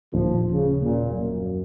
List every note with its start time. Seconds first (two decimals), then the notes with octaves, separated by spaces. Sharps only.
0.14 D#1 F3
0.51 C#3
0.82 A#2
1.11 F#2